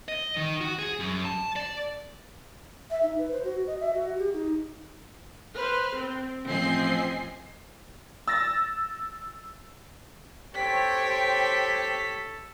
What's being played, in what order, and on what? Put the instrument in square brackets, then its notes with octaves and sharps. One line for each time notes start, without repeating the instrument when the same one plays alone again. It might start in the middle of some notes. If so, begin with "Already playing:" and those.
[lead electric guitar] D#5
D#3
F#4
G#4
F#2
A5
D5
[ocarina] E5
D#4
B4
C5
F#4
D#5
E5
F#4
G4
D#4
[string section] B4 C5 F6
C4
A1 F3 C4 D#5 G#5 C7
[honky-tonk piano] E6 A6 A#6
[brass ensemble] G4 C#5 [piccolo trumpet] A4 [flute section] C5 G5 [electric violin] B6